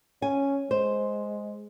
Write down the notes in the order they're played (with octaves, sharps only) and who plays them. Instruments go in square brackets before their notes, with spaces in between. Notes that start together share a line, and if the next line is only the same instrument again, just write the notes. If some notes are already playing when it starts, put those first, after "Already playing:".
[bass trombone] C#4 [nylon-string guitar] G#5
[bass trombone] G#3 [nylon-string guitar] C5